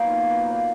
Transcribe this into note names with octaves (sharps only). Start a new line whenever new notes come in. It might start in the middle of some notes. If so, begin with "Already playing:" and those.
Already playing: A#2 F#3 B3 D#4
F4
B4
D#3 A#3 D5